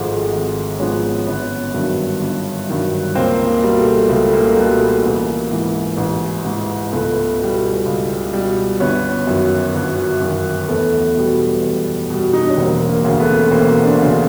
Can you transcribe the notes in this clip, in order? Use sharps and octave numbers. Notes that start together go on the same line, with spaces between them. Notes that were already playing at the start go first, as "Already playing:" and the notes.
Already playing: G#1 G#2 F3 G#3 A3
G#1
G#2 F3 G#3 B3 C#4
G1 B3 C#4
G2 D#3 F#3
G1
G2 D#3 F#3
C#2 A#3 C4
A#3
B2 G3
A3
C#2 A3
A#3
B2 G3 A3 B3
A1 A#3
G#2 E3
A1
G#2 E3
C#2 A3 B3
B2 G3
C#2
B2 G3
G1 B3 C#4
F#2 D#3
G1
F#2 D#3
E2 A3 B3
B2 G3
E2
B2 G3
D#4
D4
C#4
E1 A#3 C4
A#3
D2 C#3
A3 B3
E1 A#3 C4
C4 D4
D2 C#3